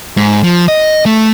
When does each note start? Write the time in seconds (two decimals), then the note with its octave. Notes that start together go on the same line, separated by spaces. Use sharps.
0.17 G#2
0.43 F3
0.68 D#5
1.06 A3